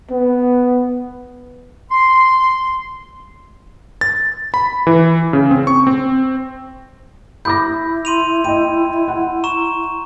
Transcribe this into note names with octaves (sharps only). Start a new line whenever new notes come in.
B3
C6
A6
B5
E3
C#3
C4
C#6
C4
E4 B5 D6 G6 A#6
C6 D#7 F7
D#5 G5 D#7
F#5
A#5 C#6 E7